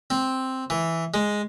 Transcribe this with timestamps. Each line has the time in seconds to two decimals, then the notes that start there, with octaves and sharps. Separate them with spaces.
0.10 C4
0.70 E3
1.14 G#3